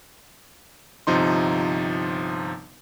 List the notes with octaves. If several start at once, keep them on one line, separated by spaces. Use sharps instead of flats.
G1 C3 F3 D#4 C6